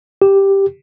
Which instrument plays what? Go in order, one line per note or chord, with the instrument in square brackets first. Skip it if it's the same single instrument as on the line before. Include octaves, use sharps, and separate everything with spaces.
[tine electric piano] G4